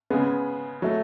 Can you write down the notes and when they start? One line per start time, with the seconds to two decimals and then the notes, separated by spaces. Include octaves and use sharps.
0.10 C#3 G#3 B3
0.82 F#3 A3